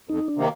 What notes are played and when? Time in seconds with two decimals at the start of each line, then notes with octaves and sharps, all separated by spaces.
0.09 F2 D#4
0.28 D4
0.36 C3 D#3 A#3